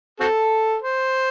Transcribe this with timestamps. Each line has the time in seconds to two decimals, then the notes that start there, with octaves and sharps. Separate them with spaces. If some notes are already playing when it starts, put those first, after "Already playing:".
0.20 C4 F#4 A4
0.82 C5